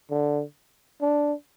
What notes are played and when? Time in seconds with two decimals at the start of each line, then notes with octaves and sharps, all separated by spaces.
0.10 D3
1.01 D4